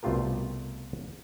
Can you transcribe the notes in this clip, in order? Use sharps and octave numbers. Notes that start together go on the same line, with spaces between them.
C2 B2 A3 F4 G4 A#4